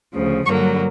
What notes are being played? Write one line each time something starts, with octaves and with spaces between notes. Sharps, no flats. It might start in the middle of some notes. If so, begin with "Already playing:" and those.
D2 C#3 F3
G2 D3 F#3 A#3 C#6